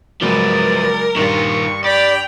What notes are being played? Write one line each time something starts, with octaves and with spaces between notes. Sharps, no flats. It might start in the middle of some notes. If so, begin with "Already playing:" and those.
C#3 F3 F#3 G#3 B3 A#4 D5
G2 D#3 G3 F4 C#6
D5 G5 B5 F7